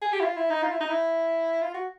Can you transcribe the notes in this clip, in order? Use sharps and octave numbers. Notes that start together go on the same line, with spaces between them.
G#4
G4
E4
F4
E4
D#4
F4
E4
D#4
E4
F4
F#4